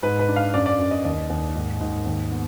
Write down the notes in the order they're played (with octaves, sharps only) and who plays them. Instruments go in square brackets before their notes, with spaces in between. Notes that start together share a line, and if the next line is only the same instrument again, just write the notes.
[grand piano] G#2 B4
B4
D4
F5
F#2 D5
D5
F#2
D#5
D#2 D#5
D#2
G#2
G#2
D#2
B3